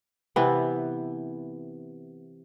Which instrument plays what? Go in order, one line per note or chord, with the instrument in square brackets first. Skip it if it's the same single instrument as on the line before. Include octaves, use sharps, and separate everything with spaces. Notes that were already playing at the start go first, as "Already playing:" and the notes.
[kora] C3 E3 B3